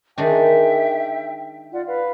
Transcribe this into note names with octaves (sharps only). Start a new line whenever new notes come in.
D#3 G#3 D4 E5 G5
F4 D5 F#5
B4 F5